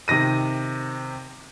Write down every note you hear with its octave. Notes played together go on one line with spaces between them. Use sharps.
C3 D#3 A#6 D#7